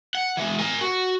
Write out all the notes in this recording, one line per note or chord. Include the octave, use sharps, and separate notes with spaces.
F#5
E3 G#3
A#4 G#5
F#4